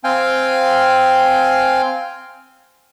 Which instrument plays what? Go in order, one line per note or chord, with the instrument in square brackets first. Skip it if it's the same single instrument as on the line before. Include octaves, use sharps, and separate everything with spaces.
[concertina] C4 F5 G5 G#5